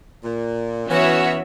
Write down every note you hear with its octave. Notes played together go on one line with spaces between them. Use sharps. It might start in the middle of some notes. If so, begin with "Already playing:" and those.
A#2
E3 B3 C#4 F#4 C#5 E5